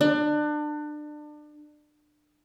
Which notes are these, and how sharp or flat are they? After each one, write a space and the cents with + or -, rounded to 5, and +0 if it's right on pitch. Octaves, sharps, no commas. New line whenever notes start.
D4 +30